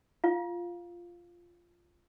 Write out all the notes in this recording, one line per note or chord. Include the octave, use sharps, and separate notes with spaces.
F4 F5